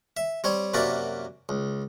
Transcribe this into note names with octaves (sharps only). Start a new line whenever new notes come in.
E5
G3 C4 C#5
F#2 C3 A#3 F#4 D5 B5
C#2